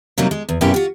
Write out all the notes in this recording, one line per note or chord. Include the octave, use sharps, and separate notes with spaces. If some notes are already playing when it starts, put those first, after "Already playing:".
C3 F#3 G3 A#3 D#4
G#3
E2
F#2 B2 A#3 C#4 E4 G4
F4 F#4